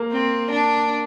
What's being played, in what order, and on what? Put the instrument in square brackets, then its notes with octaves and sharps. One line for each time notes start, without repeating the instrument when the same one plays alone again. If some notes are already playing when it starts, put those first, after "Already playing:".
Already playing: [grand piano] A#3
[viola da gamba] C4
D4